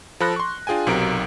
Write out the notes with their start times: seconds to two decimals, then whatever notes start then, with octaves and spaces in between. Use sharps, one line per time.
0.20 F3 A4 B5 F#6 A#6
0.36 C6 C#6
0.67 D4 F4 G#4 G5 G#5
0.87 B1 C3 F#3 A#4 D7